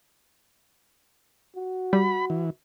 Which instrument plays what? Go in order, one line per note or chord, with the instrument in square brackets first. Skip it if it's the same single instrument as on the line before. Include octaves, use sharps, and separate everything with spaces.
[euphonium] F#4
[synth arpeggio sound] G3 [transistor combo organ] B5
[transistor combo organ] E3